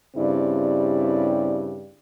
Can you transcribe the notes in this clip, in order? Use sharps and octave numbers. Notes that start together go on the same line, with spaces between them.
G2 C#3 C4 E4 G4 D5